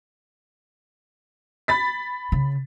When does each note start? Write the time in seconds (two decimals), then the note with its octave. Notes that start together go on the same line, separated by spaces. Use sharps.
1.68 B5 A6 B6
2.32 C#3